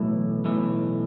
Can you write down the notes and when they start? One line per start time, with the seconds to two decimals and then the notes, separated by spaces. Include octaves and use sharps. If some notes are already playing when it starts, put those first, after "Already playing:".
Already playing: B1 A2 E3
0.44 B1 A2 E3